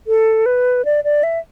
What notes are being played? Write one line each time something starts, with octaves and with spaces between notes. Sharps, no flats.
A4
B4
D5
D5
E5